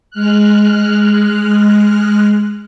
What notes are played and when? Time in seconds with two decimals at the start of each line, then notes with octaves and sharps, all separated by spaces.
0.10 G#3 F6 F#6